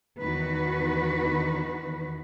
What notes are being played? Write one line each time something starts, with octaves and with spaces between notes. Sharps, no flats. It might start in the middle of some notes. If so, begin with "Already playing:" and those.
E2 D#3 F#4 B4